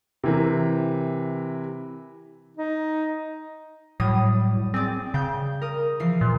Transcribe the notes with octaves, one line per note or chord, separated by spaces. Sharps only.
C3 E3 A#4
D#4
A2 F#3 G3 D#6
C4 G#4 D5
C#3 G5 G6
A#4 D#6
E3 F3 C7
A#2